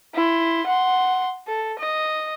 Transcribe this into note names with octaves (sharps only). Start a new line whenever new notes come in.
E4 C6
F#5 C6
A4
D#5